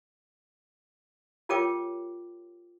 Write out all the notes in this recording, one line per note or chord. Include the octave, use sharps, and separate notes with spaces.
F4 G4 A#4 C#5 G5 D6